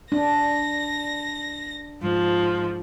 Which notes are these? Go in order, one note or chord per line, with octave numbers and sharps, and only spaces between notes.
D4 A#6
G#2 F3